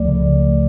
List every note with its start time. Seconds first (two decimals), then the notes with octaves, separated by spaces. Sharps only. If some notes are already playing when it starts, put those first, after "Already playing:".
Already playing: C#2 F3 A3 D5
0.08 C#3